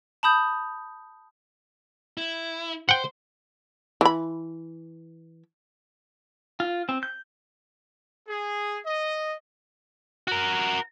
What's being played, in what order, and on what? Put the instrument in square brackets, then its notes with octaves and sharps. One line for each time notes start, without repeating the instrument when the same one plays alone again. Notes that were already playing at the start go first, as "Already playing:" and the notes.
[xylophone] A5 B5 D#6 G6
[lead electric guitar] E4
[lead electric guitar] C5 [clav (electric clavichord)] F#5 G5
[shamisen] E3 B5
[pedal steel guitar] F4
C4
G6
[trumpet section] G#4
D#5
[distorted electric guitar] F#4 A#4